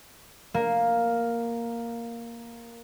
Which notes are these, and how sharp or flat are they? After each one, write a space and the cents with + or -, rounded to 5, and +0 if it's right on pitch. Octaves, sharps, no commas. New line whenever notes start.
A#3 +0